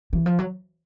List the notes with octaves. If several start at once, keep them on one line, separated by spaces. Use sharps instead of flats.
E3
F3
F#3